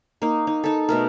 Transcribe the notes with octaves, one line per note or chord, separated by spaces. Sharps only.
A#3 D#4
D#4
D#4 A4
B2 A3 A#4